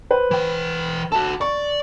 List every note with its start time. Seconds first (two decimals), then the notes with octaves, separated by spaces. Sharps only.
0.11 B4 C5
0.31 E3 G5
1.12 F#4 A4 A5
1.41 D5 C#6